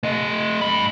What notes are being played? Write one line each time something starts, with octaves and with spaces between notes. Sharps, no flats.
A3 D#5
G2 B5